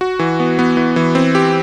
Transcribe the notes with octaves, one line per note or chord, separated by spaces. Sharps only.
F#4
E3
B3
B3
E3
E3
C4
G4